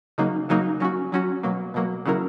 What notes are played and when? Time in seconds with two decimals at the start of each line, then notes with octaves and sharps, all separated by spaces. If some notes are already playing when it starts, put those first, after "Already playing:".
0.18 C#3 F#3 A#3 D#4
0.49 C#3 F#3 A#3 D#4
0.80 F#3 C#4 F#4
1.12 F#3 C#4 F#4
1.43 B2 F#3 A#3
1.74 B2 F#3 A#3
2.06 C#3 F#3 C#4 E4 A#4